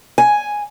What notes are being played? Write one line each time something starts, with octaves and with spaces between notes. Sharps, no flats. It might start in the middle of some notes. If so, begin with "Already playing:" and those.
G#5